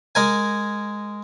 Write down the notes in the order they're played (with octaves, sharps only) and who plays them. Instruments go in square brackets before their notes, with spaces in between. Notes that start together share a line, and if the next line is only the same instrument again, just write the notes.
[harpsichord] G#3 A#4 G#5